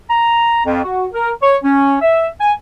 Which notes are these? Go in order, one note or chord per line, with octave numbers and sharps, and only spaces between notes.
A#5
F2
F#4
A#4
C#5
C#4
E5
G#5